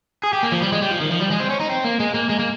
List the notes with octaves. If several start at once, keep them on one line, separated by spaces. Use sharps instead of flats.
G#4
G4
A#3
F3
G3
G#3
G3
F3
D#3
F3
G3
G#3
C4
C#4
D#4
C4
A#3
G#3
A#3
G#3
A#3